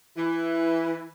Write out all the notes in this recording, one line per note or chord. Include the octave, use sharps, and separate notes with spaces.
E3